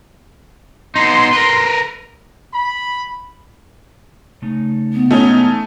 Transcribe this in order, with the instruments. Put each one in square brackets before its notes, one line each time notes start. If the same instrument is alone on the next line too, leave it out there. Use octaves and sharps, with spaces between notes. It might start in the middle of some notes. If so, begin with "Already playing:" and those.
[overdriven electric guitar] B3 D#4 [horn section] C6
[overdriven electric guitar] A#4 B4
[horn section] B5
[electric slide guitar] C#3 A3 D#4
[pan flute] B3
[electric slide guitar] B2 E3 G#3 [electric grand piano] A3 [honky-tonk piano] C#4 D#4